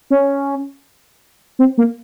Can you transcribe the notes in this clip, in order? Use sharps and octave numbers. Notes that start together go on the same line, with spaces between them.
C#4
C4
A#3